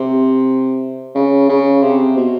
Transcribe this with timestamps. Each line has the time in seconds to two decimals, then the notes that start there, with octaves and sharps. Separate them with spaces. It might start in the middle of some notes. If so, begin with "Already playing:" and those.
Already playing: C3
1.15 C#3
1.49 C#3
1.82 C3
2.17 B2